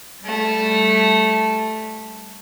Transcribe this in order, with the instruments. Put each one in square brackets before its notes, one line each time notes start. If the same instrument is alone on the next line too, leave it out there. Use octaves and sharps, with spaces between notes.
[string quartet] G3 A3